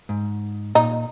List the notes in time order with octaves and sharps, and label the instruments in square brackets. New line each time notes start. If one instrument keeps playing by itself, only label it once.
[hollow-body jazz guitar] G#2
[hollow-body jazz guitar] A#2 [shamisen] D#4